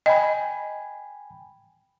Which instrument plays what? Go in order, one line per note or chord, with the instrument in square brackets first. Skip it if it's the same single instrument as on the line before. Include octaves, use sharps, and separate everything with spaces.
[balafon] D#5 [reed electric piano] G5 G#5 B5